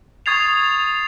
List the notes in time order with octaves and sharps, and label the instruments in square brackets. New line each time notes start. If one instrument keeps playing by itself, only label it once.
[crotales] C#6 D#6 G#6 A6 C7 F7